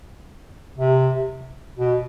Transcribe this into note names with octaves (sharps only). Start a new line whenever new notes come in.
C3
B2